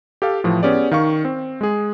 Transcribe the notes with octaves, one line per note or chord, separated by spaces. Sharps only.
G4 A4 F5
A2 E3 F3
B3 C#4 G4 G#4 D5
D#3 F5 C#6
C4
G#3 G#4